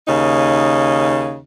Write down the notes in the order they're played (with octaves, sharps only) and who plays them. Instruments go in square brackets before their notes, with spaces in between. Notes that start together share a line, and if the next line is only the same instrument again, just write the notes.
[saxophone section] D#2 C#3 D#4